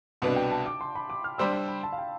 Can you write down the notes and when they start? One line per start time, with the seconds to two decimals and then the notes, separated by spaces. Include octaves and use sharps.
0.22 C2 B2 B3 D4 A5
0.36 G5
0.51 A5
0.66 D6
0.81 C6
0.95 B5
1.10 D6
1.24 F6
1.38 G3 D4 G4 C5 E6
1.53 C6
1.68 B5
1.83 A5
1.92 F5
1.98 G5